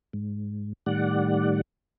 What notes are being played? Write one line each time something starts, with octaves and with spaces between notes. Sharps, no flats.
G#2
A2 D#3 G3 D5 F#5